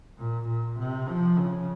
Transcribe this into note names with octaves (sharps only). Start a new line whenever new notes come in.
A#2
A#2
C3
F3
C#3